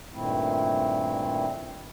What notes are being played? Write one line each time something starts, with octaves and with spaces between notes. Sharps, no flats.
G2 A#2 D#3 A3 C4 E4